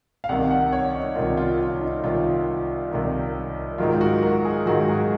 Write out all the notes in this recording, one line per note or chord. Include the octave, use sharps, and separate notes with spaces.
F5
C2 C3 D#3 F#5
F#5
C#5
D#4
C2 C3 D#3 F4
F4
F4
D#4
C2 C3 D#3 F4
C2 C3 D#3
G#2 D#3 F#3 F4
F#4
A#4
G#4
G#2 D#3 F#3 F#4
G#4